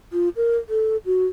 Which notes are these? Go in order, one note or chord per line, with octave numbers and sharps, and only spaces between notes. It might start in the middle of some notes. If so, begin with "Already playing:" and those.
F4
A#4
A4
F#4